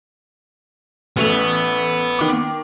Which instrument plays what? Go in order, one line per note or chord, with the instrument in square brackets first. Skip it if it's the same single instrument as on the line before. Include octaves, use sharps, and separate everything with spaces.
[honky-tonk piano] A1 A3 F7 [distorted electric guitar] B3
[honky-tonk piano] D#3 D6